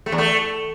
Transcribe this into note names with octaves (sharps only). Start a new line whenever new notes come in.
A3
E2
A3